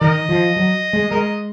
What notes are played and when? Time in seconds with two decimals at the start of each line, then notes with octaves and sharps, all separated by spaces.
0.01 D#3 A#4 D#5
0.29 F3
0.56 F#3
0.93 G#3
1.11 G#3 A#4 D#5